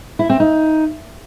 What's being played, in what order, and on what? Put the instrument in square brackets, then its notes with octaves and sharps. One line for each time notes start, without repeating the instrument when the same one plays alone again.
[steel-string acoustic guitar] E4
C4
D#4